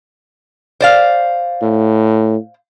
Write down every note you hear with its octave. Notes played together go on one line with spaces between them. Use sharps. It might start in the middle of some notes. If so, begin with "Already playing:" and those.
C5 D5 F5
A2